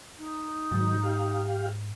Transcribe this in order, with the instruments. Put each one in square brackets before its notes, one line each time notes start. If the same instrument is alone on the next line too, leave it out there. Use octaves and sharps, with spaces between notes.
[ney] D#4
[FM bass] G#2 [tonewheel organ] D#3 F#3
[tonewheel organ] G4 F5